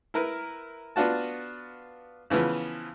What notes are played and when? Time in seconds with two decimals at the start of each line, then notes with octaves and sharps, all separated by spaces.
0.14 E4 A#4 B4
0.96 B3 D4 F4 F#4 A5
2.30 C#3 E3 F3 B3